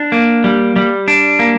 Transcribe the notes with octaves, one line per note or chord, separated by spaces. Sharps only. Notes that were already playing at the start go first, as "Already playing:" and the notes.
Already playing: D4
A#3
G3
G3
D4
A#3